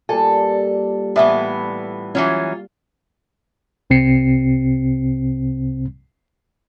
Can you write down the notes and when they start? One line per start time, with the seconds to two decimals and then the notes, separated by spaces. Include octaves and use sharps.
0.09 A#2 G3 A4 G#5
1.16 A2 E3 B3 D5 E5 G#5
2.15 E3 F#3 C#4 F4
3.90 C2 C3 C4 C7 C#7